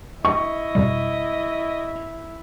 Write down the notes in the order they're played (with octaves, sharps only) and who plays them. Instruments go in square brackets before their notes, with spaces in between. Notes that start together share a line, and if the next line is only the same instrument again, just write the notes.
[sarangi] E4 [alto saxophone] D#5 [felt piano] C#6
[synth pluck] F2 B2 G3